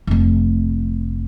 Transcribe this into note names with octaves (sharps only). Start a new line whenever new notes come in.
F1 A3